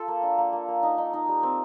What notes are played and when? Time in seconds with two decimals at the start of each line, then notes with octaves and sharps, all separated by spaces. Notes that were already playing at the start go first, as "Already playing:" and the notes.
Already playing: F4 A4
0.08 A#3
0.23 D4
0.38 A#3
0.53 A#3
0.68 A#3
0.83 D#4
0.98 D#4
1.13 D#4
1.28 G3
1.43 C4